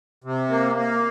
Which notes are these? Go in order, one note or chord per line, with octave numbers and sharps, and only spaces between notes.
C3
A#3
A#3